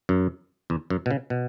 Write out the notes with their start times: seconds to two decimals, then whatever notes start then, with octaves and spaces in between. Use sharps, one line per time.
0.09 F#2
0.70 E2
0.90 F#2
1.06 B2
1.11 C#3
1.30 B2